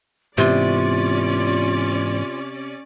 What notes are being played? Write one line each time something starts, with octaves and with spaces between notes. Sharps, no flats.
G#2 C3 E3 B3 C#4 F4 D5